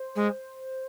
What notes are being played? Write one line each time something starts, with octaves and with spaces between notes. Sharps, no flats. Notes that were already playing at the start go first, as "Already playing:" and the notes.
Already playing: C5
G#3